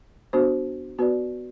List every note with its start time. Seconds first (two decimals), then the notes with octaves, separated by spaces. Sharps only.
0.33 B3 D4 F#4 C5
0.99 B3 F#4 B4 D5